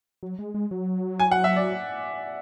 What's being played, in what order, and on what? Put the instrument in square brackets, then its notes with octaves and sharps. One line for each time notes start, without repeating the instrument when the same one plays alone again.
[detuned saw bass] F#3
G#3
G#3
F#3
[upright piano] G#5
F#5
E5
D5